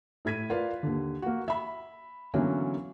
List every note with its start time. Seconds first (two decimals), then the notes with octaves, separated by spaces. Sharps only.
0.25 A2 E4 G#6 B6 D#7
0.50 F4 A#4 B4 D5 F5
0.83 D#2 D3
1.22 A#3 F#4
1.48 E5 B5
2.34 D3 E3 F#3 A#3 B3 C#4